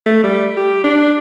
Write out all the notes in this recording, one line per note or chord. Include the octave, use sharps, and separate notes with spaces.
A3
G3
G4
D4